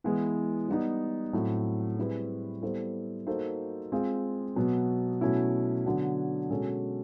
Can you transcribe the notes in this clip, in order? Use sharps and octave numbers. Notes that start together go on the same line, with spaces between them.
E3 G#3 B3 E4
G3 B3 D#4
A2 F#3 A3 C4
G3 C4 E4 G#4 B4
G3 B3 E4 A4 C5
A#3 D#4 F#4 A4 C5
G#3 C4 F4 G#4
B2 F#3 B3
B2 F#3 A3 C#4 E4
D3 F#3 B3 D4 F#4
B2 G#3 C#4 F#4 A4